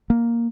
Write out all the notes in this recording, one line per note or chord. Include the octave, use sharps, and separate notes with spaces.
A#3